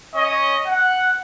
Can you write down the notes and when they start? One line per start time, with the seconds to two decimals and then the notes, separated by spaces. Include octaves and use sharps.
0.15 C#4 C#5 D#5
0.67 F#5